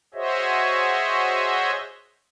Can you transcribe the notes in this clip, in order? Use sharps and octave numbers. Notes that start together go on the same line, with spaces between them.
F#4 G#4 C5 C#5 D#5 E5